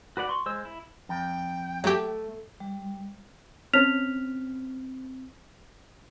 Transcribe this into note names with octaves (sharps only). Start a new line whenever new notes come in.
F#4 B4 D5 F#5
C6 C#6
G#3 C5 E6
E4
F2 G5
F#3 A3 G4
G3
C4 C#4 C#5 F6 B6 F7